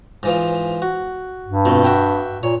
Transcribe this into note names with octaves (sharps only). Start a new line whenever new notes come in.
G#2 E3 F3
F#4
G2
F2 B2 A3
F#4 E5 G5
A#2 C#5